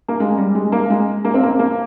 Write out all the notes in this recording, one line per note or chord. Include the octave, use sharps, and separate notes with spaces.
A#3
G#3
G3
G#3
A#3
G#3
A#3
C4
A#3
A#3